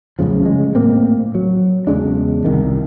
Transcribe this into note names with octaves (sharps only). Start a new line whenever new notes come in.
A1 F#2 C#3 F3
C#3 G#3
A2 A#3 C4
F#3
E2 C#3 G#3 D4
C2 D#3